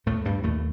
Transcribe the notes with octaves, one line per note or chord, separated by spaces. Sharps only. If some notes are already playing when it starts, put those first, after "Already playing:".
D#2 A2 A3
G2 G3
D#2 A2 A3